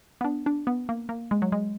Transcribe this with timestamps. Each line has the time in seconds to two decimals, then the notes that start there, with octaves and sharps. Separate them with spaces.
0.21 B3
0.24 D4
0.46 D4
0.67 B3
0.89 A#3
1.09 A#3
1.31 G#3
1.42 F#3
1.52 G#3